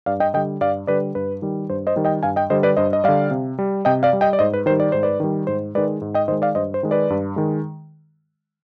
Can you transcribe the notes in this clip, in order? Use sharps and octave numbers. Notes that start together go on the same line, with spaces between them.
G2 D5 F5
D#5 G5
D3 G3 D#5 G5
G2 D5 F5
D3 G3 B4 D5
G2 B4
D#3 G3
G2 C5
C5 D#5
D#3 G3
D#5 G5
G2 F5 G#5
D#5 G5
D3 G3 C5 D#5
B4 D5
G2 C5 D#5
D#5
D3 G3 D5 F5
C3
G3
C3 D#5 G5
D5 F5
G3
D#5 G5
D5
G#2 C5 D#5
B4
D#3 G3 C5
D5
G#2 C5
B4 D5
D#3 G3
G#2 C5
D#3 G#3 B4 D5
G#2
D#5 G5
D#3 G#3 C5 D#5
D5 F5
G2 C5 D#5
C5
D#3 G#3
B4 D5
G2
D#3 G#3